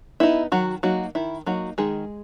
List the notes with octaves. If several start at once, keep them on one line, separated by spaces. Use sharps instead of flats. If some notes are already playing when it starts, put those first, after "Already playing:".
B3 D#4 E4
D#3 F#3 F#4
F#3 A#3 D#4 F#4
D#3 E4
F#3 A#3 D#4 F#4
D#3 G#3 G#4